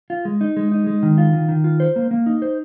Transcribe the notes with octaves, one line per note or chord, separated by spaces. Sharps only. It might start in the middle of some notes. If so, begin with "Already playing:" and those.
F4
G#3
D#4
G#3
D#4
G#3
D#3
F4
D#3
D#3
F4
C5
A#3
A#3
D#4
C5